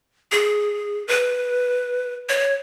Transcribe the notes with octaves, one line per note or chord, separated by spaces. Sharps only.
G#4
B4
C#5